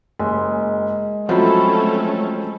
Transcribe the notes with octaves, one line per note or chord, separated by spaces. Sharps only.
F#1 G#3
F3 F#3 A3 C4 C#4 A4 F#5 B5